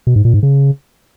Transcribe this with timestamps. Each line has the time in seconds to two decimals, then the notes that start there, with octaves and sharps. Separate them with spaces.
0.07 B2
0.16 G#2
0.25 A#2
0.34 G#2
0.43 C#3